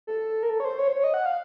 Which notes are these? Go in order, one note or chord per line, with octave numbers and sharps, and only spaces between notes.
A4
A#4
A4
C#5
C5
C#5
C5
C#5
D#5
F#5
F5